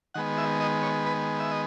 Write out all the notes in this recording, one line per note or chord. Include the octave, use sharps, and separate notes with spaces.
D#3 G#3 B3 F#5
E5
D#5
C#5
B4
E5
D#5